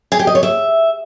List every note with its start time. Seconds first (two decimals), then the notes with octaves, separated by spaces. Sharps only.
0.12 G#4
0.19 G4
0.27 D#5
0.35 C#5
0.43 E5